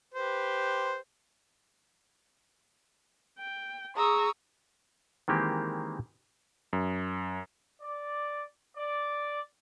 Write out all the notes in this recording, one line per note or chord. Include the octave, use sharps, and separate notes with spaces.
G4 B4 C5
G5
G#4 A#5 C#6 D#6 E6
D#3 E3 G#3 A#3 C4 G4
F#2
D5
D5